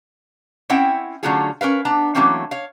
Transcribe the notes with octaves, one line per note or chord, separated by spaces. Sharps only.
C4 C#4 E4 E5 F#5 G5
D3 F#3 A3 C#4 F4 G#4
C#4 A#4 B4 F5
B3 D4 A#5
E3 F#3 A3 A#3 C4 C#4
C#5 F5